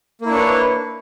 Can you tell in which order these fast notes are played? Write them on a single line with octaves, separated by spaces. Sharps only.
A#3 E4 D4 C#5 B4